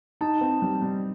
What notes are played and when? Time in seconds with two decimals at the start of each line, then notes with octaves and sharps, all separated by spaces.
0.21 D#4 A5
0.41 C4
0.62 G3
0.82 G3